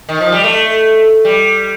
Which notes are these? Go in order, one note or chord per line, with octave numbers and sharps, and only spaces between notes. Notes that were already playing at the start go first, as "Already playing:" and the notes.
D#3
F3
G3
A3
G3